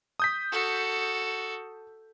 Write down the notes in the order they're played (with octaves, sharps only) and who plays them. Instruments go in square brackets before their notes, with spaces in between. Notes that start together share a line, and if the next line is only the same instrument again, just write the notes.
[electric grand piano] D#6 G6 B6
[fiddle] F#4 A4